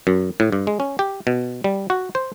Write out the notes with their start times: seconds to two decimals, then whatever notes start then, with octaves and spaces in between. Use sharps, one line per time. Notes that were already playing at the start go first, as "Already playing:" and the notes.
0.07 F#2
0.40 A2
0.52 G2
0.67 G#3
0.80 C#4
0.99 G4
1.27 B2
1.64 G3
1.90 F#4
2.15 C5